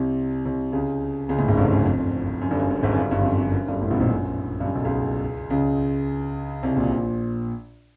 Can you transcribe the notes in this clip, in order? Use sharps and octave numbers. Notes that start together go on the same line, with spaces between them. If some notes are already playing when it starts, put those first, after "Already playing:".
Already playing: C2 C3
C2 C3
C#2 C#3
C#2 C#3
A1 A2
G#1 G#2
G1 G2
F#2
F2
F#2
G1 G2
F#2
F#2
G#1 G#2
F#2
G1 G2
G1 G2
F2
F#2
F#2
F#2
G1 G2
A1 A2
B1 B2
A#1 A#2
F#2
G2
F#2
B1 B2
C#2 C#3
C#2 C#3
C2 C3
A#1 A#2